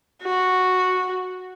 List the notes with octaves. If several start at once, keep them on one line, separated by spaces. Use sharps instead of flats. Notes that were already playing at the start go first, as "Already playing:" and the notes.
F#4